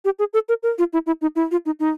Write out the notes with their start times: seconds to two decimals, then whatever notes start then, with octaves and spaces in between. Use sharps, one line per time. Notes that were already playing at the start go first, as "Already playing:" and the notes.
0.05 G4
0.19 G#4
0.33 A4
0.49 A#4
0.63 A#4
0.78 F4
0.93 E4
1.07 E4
1.21 D#4
1.36 E4
1.51 F4
1.66 D#4
1.80 D#4